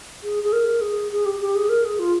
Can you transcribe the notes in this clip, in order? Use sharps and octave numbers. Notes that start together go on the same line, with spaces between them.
G#4
G#4
A#4
G#4
G#4
G4
G4
G#4
A#4
G#4
F4